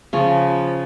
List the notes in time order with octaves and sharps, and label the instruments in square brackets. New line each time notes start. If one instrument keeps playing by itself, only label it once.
[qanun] C#3 C#4 [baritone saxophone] F3